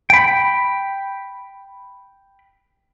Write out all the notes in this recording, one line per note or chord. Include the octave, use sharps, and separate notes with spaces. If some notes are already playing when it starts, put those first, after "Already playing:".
G5 B5